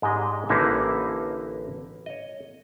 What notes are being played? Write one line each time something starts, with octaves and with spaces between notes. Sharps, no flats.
G#2 G#3 D4 G4 D#5 A#5
A1 D3 E3 A#3 D#4 E5
C#5 D#5